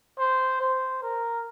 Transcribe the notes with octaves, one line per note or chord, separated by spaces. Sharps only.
C5
C5
A#4